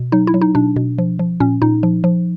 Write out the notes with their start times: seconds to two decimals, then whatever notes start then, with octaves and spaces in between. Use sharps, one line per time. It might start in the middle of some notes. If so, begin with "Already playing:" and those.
Already playing: B2
0.12 F#3 D#4
0.27 E4
0.34 F#3
0.41 D#4
0.55 B2 D4
0.76 B2
0.98 F3
1.19 F3
1.40 A#2 C#4
1.62 A#2 D#4
1.83 F3
2.04 F3